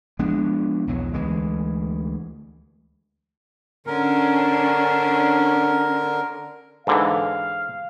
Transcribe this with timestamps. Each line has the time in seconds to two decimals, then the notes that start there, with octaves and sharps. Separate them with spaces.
0.19 F3 G#3 B3 D4
0.87 B1 E2 F#3
1.14 D2 E3 G#3
3.87 D3 C#4 D4 A#4
6.87 G#2 D3 E3 F5